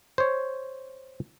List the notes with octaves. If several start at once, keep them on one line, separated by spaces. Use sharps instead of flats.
C5 C#5